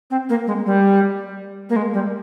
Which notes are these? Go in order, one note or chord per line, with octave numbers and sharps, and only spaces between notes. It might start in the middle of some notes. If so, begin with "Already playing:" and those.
C4
A#3
G#3
G3
A#3
G#3
G3